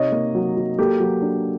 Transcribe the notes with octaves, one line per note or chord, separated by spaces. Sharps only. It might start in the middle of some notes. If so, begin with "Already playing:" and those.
Already playing: C3 D#4 C#5 D#5
A#3
F#3
F#3
A#3 G4 A4
F#3
D4